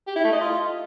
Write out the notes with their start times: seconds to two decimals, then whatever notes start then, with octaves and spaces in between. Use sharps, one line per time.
0.07 G4
0.16 E4
0.24 A3
0.32 D#5
0.41 F4